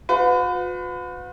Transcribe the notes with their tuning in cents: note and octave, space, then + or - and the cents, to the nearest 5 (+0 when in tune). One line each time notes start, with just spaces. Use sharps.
F#4 -45 B4 +30